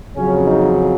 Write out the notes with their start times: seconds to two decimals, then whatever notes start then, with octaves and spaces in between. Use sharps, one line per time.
0.13 F2 C#3 F#3 C#4
0.45 D#4